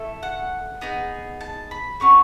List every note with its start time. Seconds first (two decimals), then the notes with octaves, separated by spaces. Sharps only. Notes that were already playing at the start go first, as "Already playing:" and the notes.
Already playing: A3 E4 A4
0.23 F#5
0.81 B3 D#4 G#4
1.41 A5
1.71 B5
2.00 A3 C#4 F#4 C#6